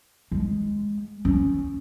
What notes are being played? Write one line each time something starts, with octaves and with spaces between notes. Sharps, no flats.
G#3
C#4